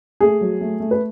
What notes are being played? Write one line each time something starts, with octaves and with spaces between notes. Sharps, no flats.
A3 G#4
F#3
A3
A3
B4